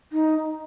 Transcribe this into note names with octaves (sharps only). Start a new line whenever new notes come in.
D#4